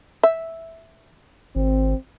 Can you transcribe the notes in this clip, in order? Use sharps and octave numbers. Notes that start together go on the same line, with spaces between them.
E5
G#1 C4